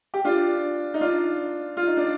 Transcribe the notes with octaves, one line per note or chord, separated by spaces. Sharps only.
G4
D4 F4
D#4
D4 F4
F4
D#4
D4